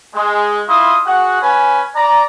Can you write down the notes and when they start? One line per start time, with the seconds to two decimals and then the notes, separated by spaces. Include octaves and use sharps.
0.14 G#3
0.68 E4 F4 D#5 C6 D#6
1.05 F#4 G#4 F#5
1.42 C#4 B4 G#5
1.95 D5 A#5